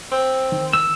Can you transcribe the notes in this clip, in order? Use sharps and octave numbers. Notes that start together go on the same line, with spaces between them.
C4
D#3
E6